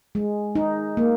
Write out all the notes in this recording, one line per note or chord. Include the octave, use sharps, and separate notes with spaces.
G#3
D#4
A#3